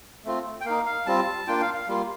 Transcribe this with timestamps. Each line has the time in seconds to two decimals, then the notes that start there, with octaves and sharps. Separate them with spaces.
0.25 A3 C4 F4
0.61 G5
0.65 A#3 D#4 F5
0.86 F5
1.06 G3 C4 F4 A5
1.47 A#3 D4 F4 G5
1.61 F5
1.74 F5
1.88 G3 A#3 F4